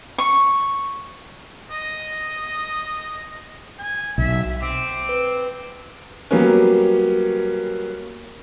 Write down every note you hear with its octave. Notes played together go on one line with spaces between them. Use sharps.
C#6
D#5
G#5
B1 E5
C4 D6
B4
F#3 G3 A#3 B3 C#4